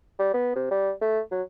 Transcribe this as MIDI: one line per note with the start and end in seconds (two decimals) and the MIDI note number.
0.19 0.32 55
0.34 0.51 59
0.56 0.70 48
0.71 0.92 55
1.01 1.20 57
1.32 1.42 54